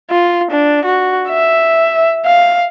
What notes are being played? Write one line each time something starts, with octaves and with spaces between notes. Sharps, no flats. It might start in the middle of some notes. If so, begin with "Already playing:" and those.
F4
D4
F#4
E5
F5